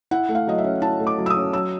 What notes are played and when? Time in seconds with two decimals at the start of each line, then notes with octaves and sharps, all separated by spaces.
0.11 E4 F#5
0.29 A3
0.35 F5
0.47 F#3 D#5
0.58 E5
0.64 C#4
0.82 E4 A5
1.00 A3
1.07 D6
1.18 F#3
1.26 E6
1.30 D#6
1.36 C#4
1.53 F#3 E6